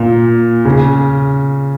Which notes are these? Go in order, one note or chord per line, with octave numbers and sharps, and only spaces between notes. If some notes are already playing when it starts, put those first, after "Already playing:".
Already playing: A#2
C#3